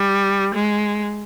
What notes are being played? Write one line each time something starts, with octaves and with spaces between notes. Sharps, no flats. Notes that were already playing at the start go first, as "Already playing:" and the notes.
Already playing: G3
G#3